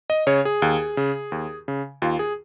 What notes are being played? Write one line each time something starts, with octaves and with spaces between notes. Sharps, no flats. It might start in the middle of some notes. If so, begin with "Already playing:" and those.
D#5
C#3 C#5
G#4
D#2
C#3
D#2
C#3
D#2 F4
G#4